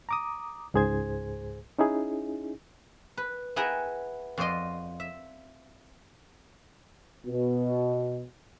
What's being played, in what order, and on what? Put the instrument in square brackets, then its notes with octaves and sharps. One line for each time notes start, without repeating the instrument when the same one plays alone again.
[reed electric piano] A#5 D6 D#6
C#2 G#2 G#4 C5 G#6
C#4 D#4 E4 G#4
[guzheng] B4
B3 E4 G#4 F#5 G5 A#5
F2 F#4 C5 D5 D#5 C6
E5
[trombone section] B2